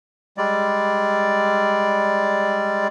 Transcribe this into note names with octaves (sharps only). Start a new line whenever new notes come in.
G3 G#3 D5